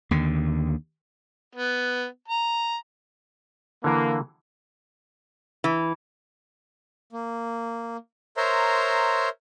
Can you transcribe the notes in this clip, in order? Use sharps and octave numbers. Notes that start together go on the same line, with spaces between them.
D#2 D3
B3
A#5
D3 E3 A#3
E3
A#3
A#4 C5 C#5 E5 A#5 C6